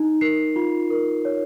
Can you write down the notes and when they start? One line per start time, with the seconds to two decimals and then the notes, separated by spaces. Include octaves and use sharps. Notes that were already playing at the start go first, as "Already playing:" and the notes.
Already playing: D#4
0.21 A#4 C7
0.56 F4
0.90 A#4
1.25 C#5